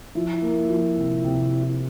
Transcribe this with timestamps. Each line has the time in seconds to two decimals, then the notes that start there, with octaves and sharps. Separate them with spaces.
0.15 F3 E4
0.42 A#3
0.69 F3
0.97 C3
1.24 C3